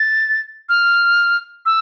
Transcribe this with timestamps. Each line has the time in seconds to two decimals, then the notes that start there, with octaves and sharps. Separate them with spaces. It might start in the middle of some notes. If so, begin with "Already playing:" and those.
Already playing: A6
0.69 F6
1.66 E6